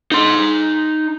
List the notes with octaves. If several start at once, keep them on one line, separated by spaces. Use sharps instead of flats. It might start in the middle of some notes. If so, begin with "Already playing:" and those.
D#4 C6